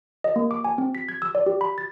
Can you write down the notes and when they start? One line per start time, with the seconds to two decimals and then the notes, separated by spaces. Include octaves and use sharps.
0.24 D#5
0.36 A#3
0.51 D6
0.64 G#5
0.78 C4
0.95 B6
1.09 G#6
1.22 E6
1.35 D5
1.46 G4
1.61 B5
1.78 A6